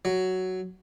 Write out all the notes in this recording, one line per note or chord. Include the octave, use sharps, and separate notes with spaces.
F#3